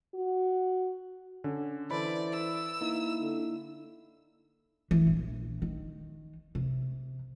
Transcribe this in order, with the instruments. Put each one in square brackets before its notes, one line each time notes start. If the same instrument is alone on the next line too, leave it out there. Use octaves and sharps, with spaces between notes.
[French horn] F#4
[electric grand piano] D3 [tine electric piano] C#4
[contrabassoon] E3 [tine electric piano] A4 C5 [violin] D5 [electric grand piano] B5
[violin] E6
[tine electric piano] A#3 D#4 E4
[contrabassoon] D3
[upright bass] E3
A#1
D#3
C3